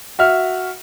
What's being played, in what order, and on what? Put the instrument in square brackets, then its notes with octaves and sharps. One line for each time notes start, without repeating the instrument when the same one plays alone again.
[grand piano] F#4 E5 F6